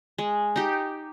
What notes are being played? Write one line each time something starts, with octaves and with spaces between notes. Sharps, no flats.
G#3
D#4 G4